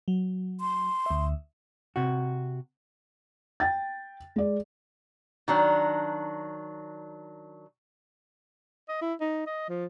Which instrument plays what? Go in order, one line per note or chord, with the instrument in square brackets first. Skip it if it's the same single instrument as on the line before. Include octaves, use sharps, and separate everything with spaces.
[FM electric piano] F#3
[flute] C6
[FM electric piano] D2 E5
[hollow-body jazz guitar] C3 F#4
[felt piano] G5 A6
G#3 D5
[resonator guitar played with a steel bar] D#3 F#3 D4
[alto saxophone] D#5
E4
D#4
D#5
F3